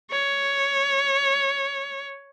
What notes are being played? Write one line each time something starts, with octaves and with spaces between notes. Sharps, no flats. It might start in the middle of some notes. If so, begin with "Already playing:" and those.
C#5